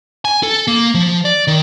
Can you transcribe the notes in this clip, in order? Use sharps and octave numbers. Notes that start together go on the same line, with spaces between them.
G#5
A4
A#3
F3
D5
D#3